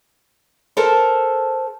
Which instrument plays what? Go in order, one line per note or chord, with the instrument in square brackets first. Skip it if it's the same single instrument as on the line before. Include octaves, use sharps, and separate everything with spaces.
[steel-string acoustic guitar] A4 A#4 C5 A5